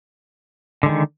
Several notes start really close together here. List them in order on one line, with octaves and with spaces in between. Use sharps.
D3 G#3 D#3